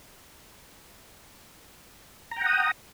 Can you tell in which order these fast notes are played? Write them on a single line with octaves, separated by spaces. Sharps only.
A#5 G5 F#5 D#6